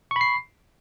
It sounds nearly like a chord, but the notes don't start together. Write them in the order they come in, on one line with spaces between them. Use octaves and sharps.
C#6 B5 C7